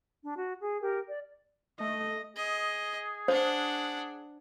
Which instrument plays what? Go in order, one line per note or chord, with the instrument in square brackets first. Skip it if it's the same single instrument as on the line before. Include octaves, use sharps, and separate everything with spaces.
[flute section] D4
F#4
G#4
G4 A#4
D5
[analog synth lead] A3 [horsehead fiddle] D#5
[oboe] G#4 [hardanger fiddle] D#5
[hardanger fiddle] D4 F#5 [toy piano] C5